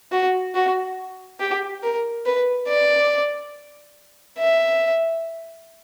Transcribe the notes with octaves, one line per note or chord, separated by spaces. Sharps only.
F#4
F#4
G4
A#4
B4
D5
E5